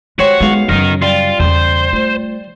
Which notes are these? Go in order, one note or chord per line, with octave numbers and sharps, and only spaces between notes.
G#3 F#4 G4 C5 C#5
B1 G#3 F5
F#2 C#3 D#4 A#4
G3 F4 G5
E2 C#3 C5
A3 F4